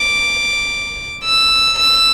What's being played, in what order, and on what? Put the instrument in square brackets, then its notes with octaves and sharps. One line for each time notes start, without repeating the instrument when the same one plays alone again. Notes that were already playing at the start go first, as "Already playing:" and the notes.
Already playing: [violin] D6
E6
E6